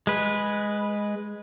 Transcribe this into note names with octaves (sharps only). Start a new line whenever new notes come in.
G#3 B4